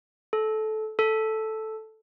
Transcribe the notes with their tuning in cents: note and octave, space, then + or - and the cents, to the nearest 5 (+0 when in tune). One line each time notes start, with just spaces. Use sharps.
A4 -20
A4 -5